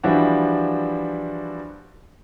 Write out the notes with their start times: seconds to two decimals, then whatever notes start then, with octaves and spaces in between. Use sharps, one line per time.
0.03 E3 F3 G3 D4 E4 F#4